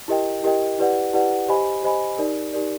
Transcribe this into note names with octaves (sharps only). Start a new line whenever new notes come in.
E4 G4 A#4 D#5 G5
E4 G4 A#4 D#5 G5
E4 G4 B4 D5 F#5
E4 G4 B4 D5 F#5
G4 C5 D#5 G#5 B5
G4 C5 D#5 G#5 B5
D#4 G4 A#4 D5
D#4 G4 A#4 D5